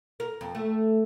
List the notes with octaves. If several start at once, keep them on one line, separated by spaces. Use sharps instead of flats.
A#4
F2
A3